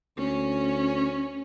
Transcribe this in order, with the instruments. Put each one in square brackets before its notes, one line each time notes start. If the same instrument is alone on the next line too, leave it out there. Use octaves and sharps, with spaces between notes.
[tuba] D2 [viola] C#4